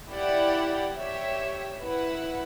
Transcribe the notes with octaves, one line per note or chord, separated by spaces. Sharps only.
E4 G4 D5 F#5
G4 C#5 E5
E4 B4 F#5